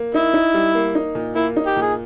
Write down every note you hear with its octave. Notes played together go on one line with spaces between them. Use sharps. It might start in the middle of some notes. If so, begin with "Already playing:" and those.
Already playing: A#3
D#4 E4
D#4
G3
A#3
D#4
A#2
A#3 E4
D#4
G4
A#2
G#4